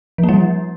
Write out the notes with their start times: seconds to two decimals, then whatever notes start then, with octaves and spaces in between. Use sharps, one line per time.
0.18 F3
0.23 A#3
0.29 G3
0.34 F3